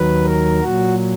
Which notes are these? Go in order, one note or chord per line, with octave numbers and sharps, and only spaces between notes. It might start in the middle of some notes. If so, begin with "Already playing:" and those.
Already playing: D#2 D#3 F#3 B4
A#4
A#2 F#3 F#4